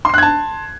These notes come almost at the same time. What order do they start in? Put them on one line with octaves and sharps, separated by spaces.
C6 C7 F#6 G#6 A5